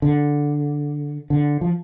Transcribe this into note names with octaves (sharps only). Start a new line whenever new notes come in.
D3
D3
F3